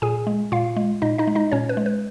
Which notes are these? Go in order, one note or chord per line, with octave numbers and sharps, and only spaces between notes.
A#2 G#4 G#5
G#3
A#2 F4 F5
G#3
A#2 D#4 D#5
D#4 D#5
G#3
D#4 D#5
A#2 C#4 C#5
B4
G#3
B4